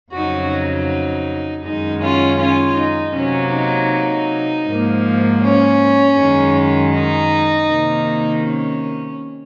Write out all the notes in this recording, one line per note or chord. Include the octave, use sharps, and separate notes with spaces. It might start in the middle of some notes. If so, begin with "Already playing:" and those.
F2 C#3 F#3 D#4 F#4
D#4
F#2 D#3 G#3 D#4
C#4 F4
C#4 F4
D#4
C3 F#3 A#3 C#4
D#4
G#2 F3 A#3
C#4
F#2 D#3 G#3
D#4
C3 D#3 A#3
C#4